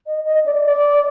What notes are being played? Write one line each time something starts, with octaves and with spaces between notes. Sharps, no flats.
D#5
D#5
D5
D5